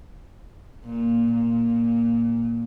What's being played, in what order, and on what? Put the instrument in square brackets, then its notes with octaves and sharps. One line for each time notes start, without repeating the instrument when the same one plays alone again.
[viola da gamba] A#2
A#2